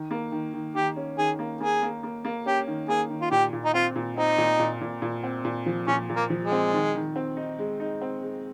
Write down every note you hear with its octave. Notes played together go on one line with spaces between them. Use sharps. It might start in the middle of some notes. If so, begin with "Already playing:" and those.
Already playing: D#3
A#3
D#3
D#3
D#3 G4
C#4
D#3 G#4
A#3
A#3 G#4
A#3
A#3
A#3
C#4 G4
D#3
A#3 G#4
D#3
F4
A#2 G4
A#2
D#4
C4 F4
A#2
C4 D#4
A#2
A#2
A#2
A#2
C4
A#2
F3
A#2 C#4
A#2
A#3
F3
G#3
C4
D#3
D#3
C4
D#4
G#3
D#4
C4
G#3